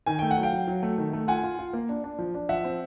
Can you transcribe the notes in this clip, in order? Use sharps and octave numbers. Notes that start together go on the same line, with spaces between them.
D#3 G#5
A3 G5
F#5
F#3
F5 G5
F#3
F#3
A3
D#3
A3
F4 F#5 G#5
F4
F4
A#3
D4
D4
F3
D4
F3 E5 F#5
C4